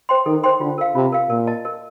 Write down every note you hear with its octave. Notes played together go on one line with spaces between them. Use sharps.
C5 G5 C6
D#3 A4
C5 G5 C6
D3 F4
A#4 F5
C3 F4
A#4 F5
A#2 A#4
D#5 A5
A#4